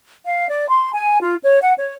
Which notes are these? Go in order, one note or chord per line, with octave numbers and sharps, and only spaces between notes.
F5
D5
C6
G#5
F4
C#5
F#5
C#5